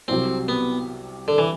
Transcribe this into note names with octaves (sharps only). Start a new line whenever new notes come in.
C2 C3 F#3 C4
B3
D3
E3